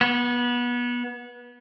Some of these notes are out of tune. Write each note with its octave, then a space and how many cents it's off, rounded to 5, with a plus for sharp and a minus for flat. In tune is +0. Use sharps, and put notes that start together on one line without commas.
B3 -25